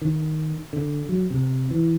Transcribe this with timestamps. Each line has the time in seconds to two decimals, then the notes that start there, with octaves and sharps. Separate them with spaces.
0.02 D#3
0.73 D3
1.09 F#3
1.30 C3
1.71 E3